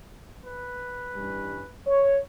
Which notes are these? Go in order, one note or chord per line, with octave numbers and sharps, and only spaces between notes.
B4
G2 E3 G3 C#4
C#5